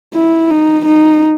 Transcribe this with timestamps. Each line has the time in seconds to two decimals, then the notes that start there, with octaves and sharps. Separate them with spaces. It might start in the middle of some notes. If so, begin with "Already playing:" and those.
0.14 E4
0.50 D#4
0.85 D#4